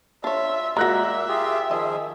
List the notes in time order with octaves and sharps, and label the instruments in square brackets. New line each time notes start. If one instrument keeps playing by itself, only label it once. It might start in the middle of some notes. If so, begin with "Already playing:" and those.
[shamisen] D4 C#5 [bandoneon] F4 [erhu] E5
[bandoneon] A#2 A#3 [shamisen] G#3 F#4 [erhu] E5 [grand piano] A#5 F#6 A#6
[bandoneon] F4 G4 G#4
[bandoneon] D#3 F3 G#4 [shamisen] D#5